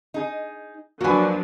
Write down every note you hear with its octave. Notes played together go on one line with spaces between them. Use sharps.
D#4 G#4
F3 F#3 A#3 D4 F#4 B4 G#5